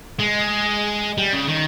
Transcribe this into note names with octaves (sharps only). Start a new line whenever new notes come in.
G#3
G3
C#3
D#3